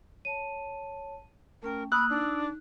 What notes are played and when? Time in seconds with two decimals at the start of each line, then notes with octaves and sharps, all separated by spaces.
0.25 C#5 A5 D#7
1.63 A3 C#4 A#4 G5
1.92 A#3 B5 D#6 E6 F#6
2.10 D4 D#4